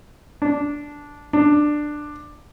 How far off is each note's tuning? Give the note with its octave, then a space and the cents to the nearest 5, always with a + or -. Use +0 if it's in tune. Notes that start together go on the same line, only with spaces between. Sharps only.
D4 -5
D4 +15